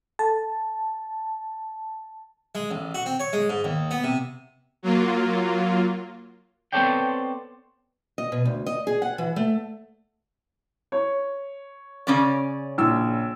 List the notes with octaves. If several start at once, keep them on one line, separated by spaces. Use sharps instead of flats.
A4 A5
G#3
A1
F#4
C4
C#5
G#3
G#2
D#2
B3
C3
F#3 A#3 F4
B3 C4 A4 C#5 D5 G5
D#5
B2
D2
D#5
G#4
F#5
E3
A3
C#5
C#3 C#4 D5
A#1 E6